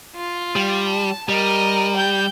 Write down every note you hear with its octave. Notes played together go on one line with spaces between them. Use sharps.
F4
G3
A5
G3 A#4 D#5
G5 G6